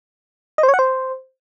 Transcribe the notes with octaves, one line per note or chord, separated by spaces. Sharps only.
D#5
C5
C#5
F#5
C5